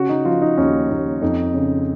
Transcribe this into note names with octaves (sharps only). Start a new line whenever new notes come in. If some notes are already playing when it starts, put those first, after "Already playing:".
Already playing: C#3 F#4
D#4
F3 F4
D#4
D#2 C#4
D#2 D#4
F2 D#4
C#3